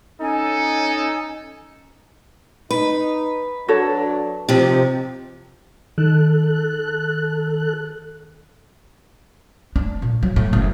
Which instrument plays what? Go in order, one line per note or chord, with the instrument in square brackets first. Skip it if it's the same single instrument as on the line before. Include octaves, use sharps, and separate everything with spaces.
[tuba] C#4 [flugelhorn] D#4 [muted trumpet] A4 [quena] G#5
[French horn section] D#4 [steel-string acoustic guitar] B4
[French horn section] F#3 D4 [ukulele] F#4 A4 C#5
[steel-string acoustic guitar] C3 F3 [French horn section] C4 D#4 G4
[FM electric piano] D#3 [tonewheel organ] A4 F#6
[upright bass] D4
A#2
F#3
A2
F#1